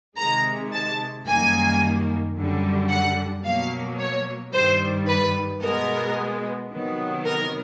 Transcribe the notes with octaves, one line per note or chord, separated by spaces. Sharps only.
C3 D#3 G#3 A#5
A5
F#2 D#3 G3 A#3 G#5
F#2 D3 G3
F#5
B2 F#3 A#3 F5
C#5
G2 D#3 G3 C5
B4
B2 G#3 B3 A#4
C3 D#3 F#3 B3
A#4